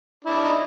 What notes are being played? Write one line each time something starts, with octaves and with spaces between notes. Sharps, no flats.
D4 E4
D#4